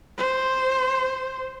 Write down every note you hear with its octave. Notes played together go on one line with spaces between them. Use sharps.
C5